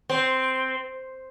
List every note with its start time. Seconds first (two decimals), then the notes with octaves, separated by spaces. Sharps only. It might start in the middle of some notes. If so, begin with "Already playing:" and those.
0.10 C4